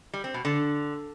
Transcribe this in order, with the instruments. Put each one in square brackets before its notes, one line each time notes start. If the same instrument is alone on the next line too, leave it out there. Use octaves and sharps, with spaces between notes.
[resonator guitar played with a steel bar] G3
C4
B2
D3